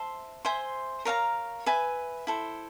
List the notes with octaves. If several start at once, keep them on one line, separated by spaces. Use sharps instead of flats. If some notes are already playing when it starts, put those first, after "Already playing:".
Already playing: C5 E5 A5 C6
C5 E5 G#5 C6
A#4 C#5 F5 A#5
B4 E5 G#5
E4 A4 C5